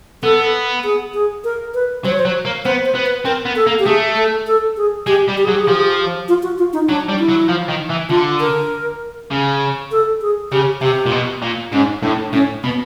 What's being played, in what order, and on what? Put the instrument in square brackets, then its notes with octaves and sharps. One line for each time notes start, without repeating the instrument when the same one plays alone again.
[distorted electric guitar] B3 [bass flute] A4
[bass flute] G#4
G#4
A#4
B4
[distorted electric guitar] F#3 [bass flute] C5
[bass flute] C#5
C5
[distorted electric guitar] F#3
A#3
[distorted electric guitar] B3 [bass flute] C5
[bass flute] C5
[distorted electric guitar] B3
[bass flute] B4
[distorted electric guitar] C4 [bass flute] A#4
[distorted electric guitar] B3
[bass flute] A4
[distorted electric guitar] A#3
[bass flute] G4
[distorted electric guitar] A3 [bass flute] G#4
[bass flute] A4
A4
G#4
[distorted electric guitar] G#3 [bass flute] G4
[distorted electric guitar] G3
[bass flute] G4
G#4
[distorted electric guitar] F#3
[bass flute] G4
G#4
[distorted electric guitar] F3 [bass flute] G4
[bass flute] G#4
G4
F4
F#4
F4
D#4
[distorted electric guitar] F#3 [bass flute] D4
[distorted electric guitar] G3
[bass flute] E4
[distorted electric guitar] F#3
F3
D#3
E3
[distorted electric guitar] D3 [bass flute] F4
[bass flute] A#4
[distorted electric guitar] C#3
[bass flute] A4
G#4
[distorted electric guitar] C#3 [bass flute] G4
[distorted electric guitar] C3 [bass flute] G4
[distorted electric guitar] A#2
B2
A#2
[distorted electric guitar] G#2 [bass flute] C#4
[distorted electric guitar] A2 [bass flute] D4
[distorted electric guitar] A2 [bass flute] C#4
[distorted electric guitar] B2 [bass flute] B3